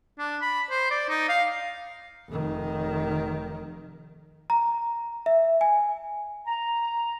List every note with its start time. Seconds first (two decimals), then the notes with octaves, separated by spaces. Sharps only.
0.19 D4
0.41 B5
0.70 C5
0.91 D5
1.09 D#4
1.29 F5
2.29 F1 D#3
4.50 A#5
5.26 E5
5.61 G#5
6.46 A#5